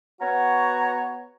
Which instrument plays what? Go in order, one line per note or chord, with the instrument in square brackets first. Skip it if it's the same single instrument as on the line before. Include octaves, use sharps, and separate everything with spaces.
[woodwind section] B3 F#4 C#5 A#5